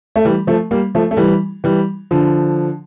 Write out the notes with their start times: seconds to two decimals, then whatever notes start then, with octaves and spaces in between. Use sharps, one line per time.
0.16 A3
0.25 E3 G3
0.47 F3 A3
0.71 G3 A#3
0.95 F3 A3
1.11 A3
1.17 E3 G3
1.64 E3 G3
2.11 D3 F3